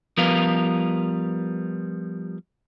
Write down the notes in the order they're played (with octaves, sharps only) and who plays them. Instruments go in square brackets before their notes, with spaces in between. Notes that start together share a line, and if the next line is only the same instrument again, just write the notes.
[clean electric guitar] F3 G3 B3 A#4 B4 F5